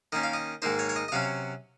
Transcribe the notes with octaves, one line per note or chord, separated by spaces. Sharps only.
D#3 A#3 C#4 D#5
F5
D#5
G#2 D#3 A#3 D#4 C5
C#5
C#5
D#5
D#5
C3 F#3 C#4 F5